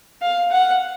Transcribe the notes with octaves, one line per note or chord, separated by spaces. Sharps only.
F5
F#5